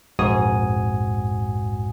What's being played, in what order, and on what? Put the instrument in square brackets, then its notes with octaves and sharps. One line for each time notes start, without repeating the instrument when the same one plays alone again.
[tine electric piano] A#1 F2 G#2 F#4 G#5 D#6